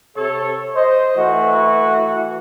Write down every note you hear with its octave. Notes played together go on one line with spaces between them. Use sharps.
C3 A4 C#5
C5 D#5
E3 A3 F#4